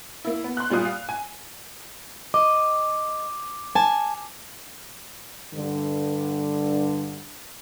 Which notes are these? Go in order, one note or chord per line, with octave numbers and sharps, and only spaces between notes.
A#3 E4
B3
C6 F#6
A#2 G3 F4 D#6
F5
G#5
D#5 D6
G#5 A5
G2 D3